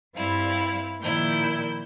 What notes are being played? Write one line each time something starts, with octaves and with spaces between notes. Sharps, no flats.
G2 G3 C4 E4 F5
A#2 D#3 F3 A#3 E4 G6